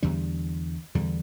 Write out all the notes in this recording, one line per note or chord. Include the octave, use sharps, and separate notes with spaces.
E2 D3 G3
E2 D3 G3